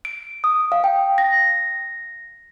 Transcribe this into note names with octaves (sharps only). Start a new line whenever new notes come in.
D7
D#6
F5
G5
A#6